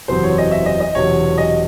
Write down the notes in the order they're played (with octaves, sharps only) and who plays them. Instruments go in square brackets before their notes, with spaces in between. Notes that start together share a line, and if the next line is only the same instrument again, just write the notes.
[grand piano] F#1 E2 C3 F#3 C4 C5
C#5
D#5
E5
D#5
D#5
E1 E2 C3 F#3 C#5
D#5